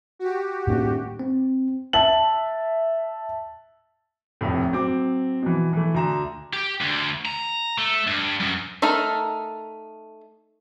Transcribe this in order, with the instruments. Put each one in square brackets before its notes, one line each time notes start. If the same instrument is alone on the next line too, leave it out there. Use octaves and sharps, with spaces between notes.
[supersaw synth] F#4 G4
[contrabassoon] D#1 [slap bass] A2 A3 D4
[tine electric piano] C4
[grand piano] E5 A5 F#7
F1 A2
F#3 C4 D6
B2 E3
E3 A3
D2 A#5 E7
[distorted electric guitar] G4
D2
A#5
A3
G2
F#2
[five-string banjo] A3 D#4 A4 A#4